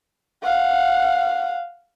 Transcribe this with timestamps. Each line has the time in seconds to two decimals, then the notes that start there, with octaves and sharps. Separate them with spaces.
0.43 F5 F#5